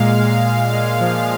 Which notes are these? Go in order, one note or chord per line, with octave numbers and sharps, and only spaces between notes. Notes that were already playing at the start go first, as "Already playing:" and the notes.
Already playing: A#2 G#3 F5
G#3
G#3
G#3
F3